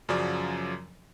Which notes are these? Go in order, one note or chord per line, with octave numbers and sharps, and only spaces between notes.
F#2 C#3 F3 F#3 D5 D6